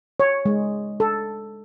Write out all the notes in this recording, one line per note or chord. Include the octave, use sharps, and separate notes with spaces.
C#5
G#3
A4